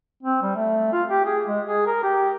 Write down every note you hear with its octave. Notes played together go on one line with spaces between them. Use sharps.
C4
G3
A3
F4
G4
G#4
G#3
G#4
A#4
G4